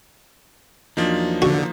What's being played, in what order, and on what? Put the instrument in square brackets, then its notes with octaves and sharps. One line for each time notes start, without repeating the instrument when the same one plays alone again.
[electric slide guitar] E2 F#3 D4 [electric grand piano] F3 A#3 D#4
[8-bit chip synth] D3 [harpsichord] F#4